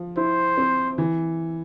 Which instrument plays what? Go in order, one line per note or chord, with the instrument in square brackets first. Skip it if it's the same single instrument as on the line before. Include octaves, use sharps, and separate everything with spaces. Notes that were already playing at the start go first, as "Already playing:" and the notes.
Already playing: [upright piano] F3
[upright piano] E4 [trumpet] C5
[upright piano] C4
E3